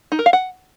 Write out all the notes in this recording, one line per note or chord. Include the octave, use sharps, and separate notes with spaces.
D#4
A#4
F5
F#5